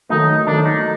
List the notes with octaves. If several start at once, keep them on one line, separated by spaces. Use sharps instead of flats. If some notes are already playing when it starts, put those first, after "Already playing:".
D#3 F#3 A3 D#4
D#3 F#3 A3 D4
D#4